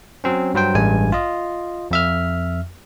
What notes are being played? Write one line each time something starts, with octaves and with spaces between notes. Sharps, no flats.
F#3 C4 C#4
G2 F#3 C5 G5
A1 G2 G#3 G#5
F4 D#5
F2 E5 F6